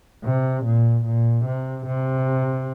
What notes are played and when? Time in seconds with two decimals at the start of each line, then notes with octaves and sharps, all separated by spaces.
0.24 C3
0.65 A#2
1.05 A#2
1.45 C3
1.86 C3